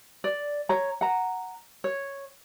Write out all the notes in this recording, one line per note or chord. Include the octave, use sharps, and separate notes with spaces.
D5
C#5 A#5
F#5 A#5
C#5